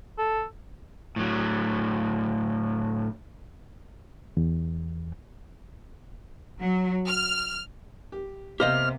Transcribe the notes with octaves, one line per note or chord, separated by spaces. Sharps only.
A4
A2 F#3
E2
F#3
F6
G4
C3 A#3 B3 G4 C5 D#5 F5 F6